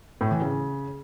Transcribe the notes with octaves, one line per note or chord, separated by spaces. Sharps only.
A2
E3
C#3